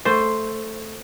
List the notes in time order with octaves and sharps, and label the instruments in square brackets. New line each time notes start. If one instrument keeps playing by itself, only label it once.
[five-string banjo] A3 [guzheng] C5